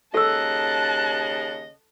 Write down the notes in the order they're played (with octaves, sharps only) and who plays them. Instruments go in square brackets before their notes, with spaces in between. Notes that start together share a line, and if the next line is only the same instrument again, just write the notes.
[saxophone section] D#2 C#3 D#5 [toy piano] A4 E6 [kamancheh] A5 F#6